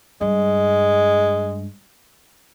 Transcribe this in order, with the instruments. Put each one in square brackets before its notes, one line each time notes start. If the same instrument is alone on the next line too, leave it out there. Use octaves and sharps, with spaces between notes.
[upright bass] G2 [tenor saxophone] G#3